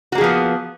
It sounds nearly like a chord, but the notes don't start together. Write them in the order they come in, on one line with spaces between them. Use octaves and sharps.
F#4 A#3 G#4 F3 B3